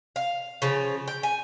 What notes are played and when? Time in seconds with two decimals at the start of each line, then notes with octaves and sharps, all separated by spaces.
0.16 F5
0.62 C#3 F3
1.08 G5
1.23 G#5